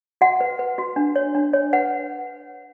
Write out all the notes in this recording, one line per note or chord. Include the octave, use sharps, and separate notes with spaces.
F#4 F#5
B4
B4
F#4
D4
C#5
D4
C#5
B4 F#5